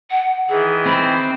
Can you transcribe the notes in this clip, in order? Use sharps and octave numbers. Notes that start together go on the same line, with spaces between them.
F#5
D#3 E3 G#4
C4 B5